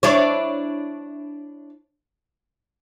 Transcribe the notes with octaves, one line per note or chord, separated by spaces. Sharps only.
D4 E4 C#5